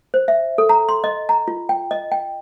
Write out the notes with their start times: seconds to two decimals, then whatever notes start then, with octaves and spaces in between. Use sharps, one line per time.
0.14 C5
0.28 E5
0.58 A4
0.69 A#5
0.89 C6
1.04 D#5
1.29 A#5
1.48 F4
1.69 G5
1.91 D#5
2.12 G5